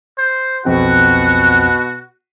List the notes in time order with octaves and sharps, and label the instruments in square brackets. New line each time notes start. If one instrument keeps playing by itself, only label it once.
[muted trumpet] C5
[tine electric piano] B1 F2 C4 [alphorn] B2 [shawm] F#4 [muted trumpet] F#5